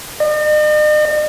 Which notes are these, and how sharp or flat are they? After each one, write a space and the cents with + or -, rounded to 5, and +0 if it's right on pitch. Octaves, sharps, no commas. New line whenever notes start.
D#5 -45